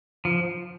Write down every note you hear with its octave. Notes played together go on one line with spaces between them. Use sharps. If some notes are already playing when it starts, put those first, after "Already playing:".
F3